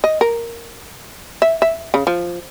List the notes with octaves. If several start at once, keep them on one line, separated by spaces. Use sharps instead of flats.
D#5
A#4
E5
E5
C#3
F3